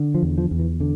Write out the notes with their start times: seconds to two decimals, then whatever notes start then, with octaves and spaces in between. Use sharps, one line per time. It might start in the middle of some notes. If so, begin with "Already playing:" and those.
Already playing: D3
0.15 F3
0.23 E2
0.38 F3
0.51 E2
0.59 E3
0.80 D3